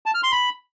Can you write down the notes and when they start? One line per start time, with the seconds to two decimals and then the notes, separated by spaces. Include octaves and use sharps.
0.06 A5
0.14 F6
0.23 C6
0.32 B5